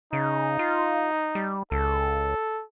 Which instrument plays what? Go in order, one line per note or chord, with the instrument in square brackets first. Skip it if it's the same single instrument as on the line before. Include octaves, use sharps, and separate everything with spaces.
[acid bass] C#3 [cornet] D#4
[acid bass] F4
G3
[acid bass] C#2 [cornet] A4